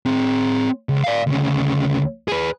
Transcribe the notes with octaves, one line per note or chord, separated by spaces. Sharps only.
C4 G#4
C#2
D5 F5
D2 C#3
G#4 B4